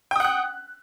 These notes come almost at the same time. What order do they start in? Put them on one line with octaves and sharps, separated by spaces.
G5 D#6 F#5 F#6